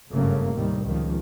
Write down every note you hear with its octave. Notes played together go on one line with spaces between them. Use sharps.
F#1 G2 C#3 F#3 A3 A#3
D#2 A2 C3 D#3 G3
C#2 D#3 F3